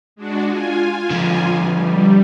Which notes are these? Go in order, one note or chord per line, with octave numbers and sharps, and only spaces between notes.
G#3 D4 F#4
F4 G#5
D3 F3
G3